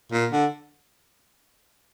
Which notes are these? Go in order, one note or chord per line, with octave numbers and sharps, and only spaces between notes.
A#2
D3